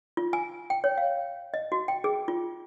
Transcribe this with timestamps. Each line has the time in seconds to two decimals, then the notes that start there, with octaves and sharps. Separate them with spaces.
0.17 F4
0.33 G#5
0.70 G5
0.84 C#5
0.98 F5
1.54 D#5
1.72 F#4
1.88 G5
2.04 G#4
2.28 F4